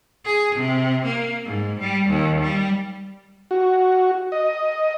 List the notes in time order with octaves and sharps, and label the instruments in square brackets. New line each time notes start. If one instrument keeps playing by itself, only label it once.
[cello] G#4
C3
A#3
G#2
G3
D#2
G3
[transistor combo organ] F#4
D#5